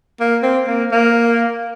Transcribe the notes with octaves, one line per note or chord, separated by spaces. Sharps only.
A#3
C4
A#3
A#3